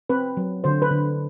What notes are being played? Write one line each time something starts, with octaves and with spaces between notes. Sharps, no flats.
C4 B4
F#3
D3 C5
B4
D3